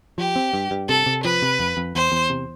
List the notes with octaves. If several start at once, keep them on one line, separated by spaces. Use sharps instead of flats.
F3 G4
C4
G2
G2
C3 A4
C3
F3 B4
C3
F2
F2
E2 C5
E2
C3